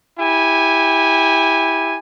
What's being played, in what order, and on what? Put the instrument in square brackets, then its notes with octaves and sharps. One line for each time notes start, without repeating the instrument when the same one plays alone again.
[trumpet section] E4 G4 G#5